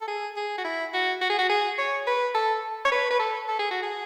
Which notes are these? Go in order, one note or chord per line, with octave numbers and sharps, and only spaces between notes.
A4
G#4
G#4
F#4
E4
F#4
F#4
G#4
F#4
G#4
C#5
B4
A4
C#5
B4
B4
A4
A4
G#4
F#4
G#4